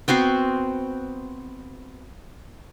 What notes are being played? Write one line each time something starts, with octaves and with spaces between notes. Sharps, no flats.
B3 C4 F#4 C5